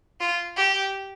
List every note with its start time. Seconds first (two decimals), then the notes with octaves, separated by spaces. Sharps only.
0.20 F4
0.57 G4